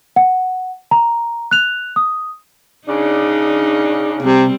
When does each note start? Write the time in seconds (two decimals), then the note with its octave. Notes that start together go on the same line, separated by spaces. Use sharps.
0.16 F#5
0.91 A#5
1.51 F#6 F7
1.96 D#6
2.88 C#3 D4 D#4
4.22 C3 G3 C4